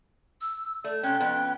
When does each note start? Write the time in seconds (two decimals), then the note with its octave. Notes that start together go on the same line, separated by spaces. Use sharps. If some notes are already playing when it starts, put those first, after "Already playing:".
0.41 E6
0.84 A3 D5
1.03 C3 C#4 G5 F#6
1.20 F2 B3 C#4 F#6